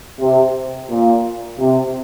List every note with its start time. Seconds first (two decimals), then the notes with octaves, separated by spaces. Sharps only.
0.21 C3
0.90 A#2
1.59 C3